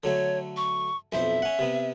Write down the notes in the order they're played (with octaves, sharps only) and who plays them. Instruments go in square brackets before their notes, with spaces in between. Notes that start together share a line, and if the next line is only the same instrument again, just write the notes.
[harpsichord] D3 F#3 A3 [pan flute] C#5
[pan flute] C#6
[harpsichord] B1 F2 C5 [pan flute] E5
[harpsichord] C#4 F#5
C3 B3